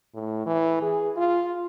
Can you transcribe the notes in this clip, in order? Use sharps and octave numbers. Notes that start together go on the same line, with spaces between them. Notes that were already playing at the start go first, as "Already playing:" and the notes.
A2
E3
G#4
F4